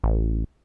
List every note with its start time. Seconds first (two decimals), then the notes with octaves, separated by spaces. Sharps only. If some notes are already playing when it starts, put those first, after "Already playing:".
0.04 A1